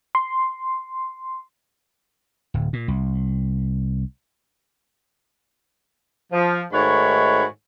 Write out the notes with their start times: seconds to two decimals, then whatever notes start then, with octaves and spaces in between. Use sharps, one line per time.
0.15 C6
2.54 D1
2.73 A#2
2.88 C2
6.32 F3
6.73 G#2 D#3 A3 F#4 C#5 B5